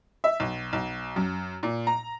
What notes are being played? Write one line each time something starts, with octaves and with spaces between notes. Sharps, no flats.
E5
B1
B1
F#2
A#2
A#5